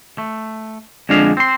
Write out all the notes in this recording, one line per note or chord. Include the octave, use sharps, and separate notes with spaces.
A3
F2 D3 G#3 D4 F5
C4 C6